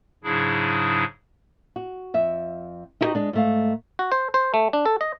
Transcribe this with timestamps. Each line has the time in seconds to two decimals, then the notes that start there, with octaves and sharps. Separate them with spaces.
0.24 G#2 C#3 F#3 D4 E4 G#4
1.76 F#4
2.14 F2 E5
3.01 D#4 E4 F#4 G4 B4 D#5
3.15 G#3 D4
3.33 G#2 A3 F5
3.99 F#4
4.12 C5
4.34 C5
4.54 A3
4.73 D4
4.86 A4
5.01 D#5